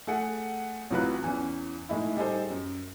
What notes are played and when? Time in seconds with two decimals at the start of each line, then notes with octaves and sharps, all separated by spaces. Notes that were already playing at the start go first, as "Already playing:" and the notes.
0.07 A3 G#4 F#5
0.90 A1 C3 F#3 F4 B4 F#6
1.22 E2 E3 C#4
1.89 A2 G#3 D#4 E4
2.17 G3 D#4 G#4 A4 C5
2.50 F#2